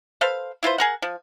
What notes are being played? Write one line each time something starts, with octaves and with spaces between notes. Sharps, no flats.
A4 B4 C5 F5
E4 F4 B4 C5
G#4 A#4 F#5
F3